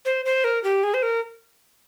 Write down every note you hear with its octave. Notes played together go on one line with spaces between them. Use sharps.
C5
C5
A#4
G4
G#4
C5
A#4